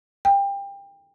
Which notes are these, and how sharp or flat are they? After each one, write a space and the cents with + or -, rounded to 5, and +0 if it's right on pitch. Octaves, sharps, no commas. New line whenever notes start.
G5 +25